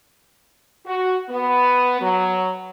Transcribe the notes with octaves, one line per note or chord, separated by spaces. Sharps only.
F#4
B3
F#3